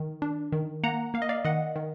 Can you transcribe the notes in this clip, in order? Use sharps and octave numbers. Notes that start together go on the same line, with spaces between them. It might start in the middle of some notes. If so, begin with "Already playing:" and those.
Already playing: D#3
D4
D#3
A#3 F#5 A#5
A#3 F5
D#5
D5 F5
D#3 D#5 F#5
D#3